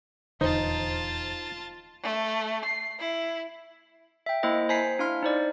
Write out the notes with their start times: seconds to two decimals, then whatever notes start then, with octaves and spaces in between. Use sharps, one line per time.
0.41 D#1 E2 D3 D#4 F4 C5 A5
2.03 A3
2.65 C7
3.00 E4
4.26 E5 G5
4.43 A#3 E4 C5 D#5 G5
4.69 C5 G#5 A#5 B6 C7
4.99 D4 E4 F5 C6 F6
5.23 D#4 C5 D5